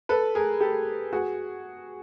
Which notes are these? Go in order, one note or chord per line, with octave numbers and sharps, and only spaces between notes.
A4 B4
G#4 A#4
G4 A4
F#4 G#4